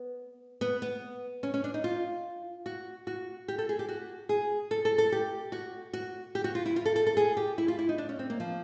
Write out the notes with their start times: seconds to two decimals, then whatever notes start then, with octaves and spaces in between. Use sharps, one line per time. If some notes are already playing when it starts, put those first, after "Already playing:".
Already playing: B3
0.61 B3
0.82 B3
1.43 C#4
1.54 C#4
1.64 D4
1.74 D#4
1.84 F4
2.66 F#4
3.07 F#4
3.48 G4
3.58 A4
3.69 G#4
3.79 G4
3.88 F#4
4.29 G#4
4.71 A4
4.85 A4
4.98 A4
5.12 G4
5.52 F#4
5.93 F#4
6.35 G4
6.44 F#4
6.55 F4
6.66 E4
6.76 F4
6.86 A4
6.96 A4
7.07 A4
7.17 G#4
7.37 G4
7.58 E4
7.68 F4
7.79 E4
7.89 D#4
7.98 D4
8.09 C#4
8.19 C4
8.30 A#3
8.40 F3